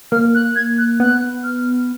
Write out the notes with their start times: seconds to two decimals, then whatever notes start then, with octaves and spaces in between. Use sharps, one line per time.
0.12 A#3 F6
0.35 F#6
0.56 G#6
0.78 F#6
1.00 B3 F#6
1.44 F6